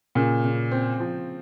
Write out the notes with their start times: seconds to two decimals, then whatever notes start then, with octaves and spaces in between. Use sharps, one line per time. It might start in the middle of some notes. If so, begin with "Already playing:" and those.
0.15 A#2 C#3
0.44 C#3
0.71 C4
1.00 F3